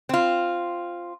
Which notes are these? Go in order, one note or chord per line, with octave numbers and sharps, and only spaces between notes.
C4 F4